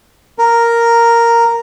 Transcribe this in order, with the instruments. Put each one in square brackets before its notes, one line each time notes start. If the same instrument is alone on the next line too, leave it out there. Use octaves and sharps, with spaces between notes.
[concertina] A#4